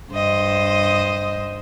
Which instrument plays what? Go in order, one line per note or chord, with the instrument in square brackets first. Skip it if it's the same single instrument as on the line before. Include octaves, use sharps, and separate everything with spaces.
[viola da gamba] G2 C5 D#5